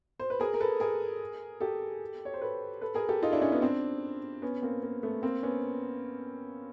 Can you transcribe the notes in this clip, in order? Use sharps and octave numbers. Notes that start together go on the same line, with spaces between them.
C5
B4
G#4 A#4
A#4
A4 B4
G#4 A#4
G4 A4
C#5
C5
A4 B4
A4 B4
G#4 A#4
G4 A4
D#4 F4
D4 E4
C#4 D#4
B3 C#4
C4 D4
B3 C#4
A#3 C4
A#3
A3 B3
A#3 C4
B3 C#4